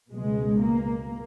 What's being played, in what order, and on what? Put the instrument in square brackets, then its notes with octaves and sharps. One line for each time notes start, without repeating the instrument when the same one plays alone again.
[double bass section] C#2 B2 G#3
A#3